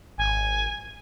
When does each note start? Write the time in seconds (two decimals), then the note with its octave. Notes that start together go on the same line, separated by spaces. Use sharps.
0.18 G#1 G#5